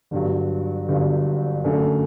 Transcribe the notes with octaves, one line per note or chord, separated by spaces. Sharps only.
G1 G2 F#3
G1 G2 F#3
F#2 D3 A3